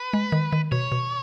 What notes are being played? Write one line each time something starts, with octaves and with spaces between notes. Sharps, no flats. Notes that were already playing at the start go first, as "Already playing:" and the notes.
Already playing: B4
G#3
D#3
D#3
B2 C#5
B2